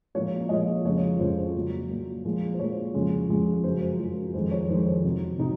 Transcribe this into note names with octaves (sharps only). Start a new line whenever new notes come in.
A#2 F3 G#3 C#5
C#5
A#2 F3 G#3 D#5
F2 C#3 F3 G#3 C#5
F2 C#3 F3 G#3 C5
A#2 F#3
A#2 F#3
A#2 F3 G#3
C5
A#2 F3 G#3 C#5
F2 C#3 F3 G#3
F2 C#3 F3 G#3
F#2 F3 G#3 C5
F#2 F3 G#3
F2 D#3 G#3 C5
C#5
F2 D#3 G#3 C5
C3 F#3
C3 F#3 D#4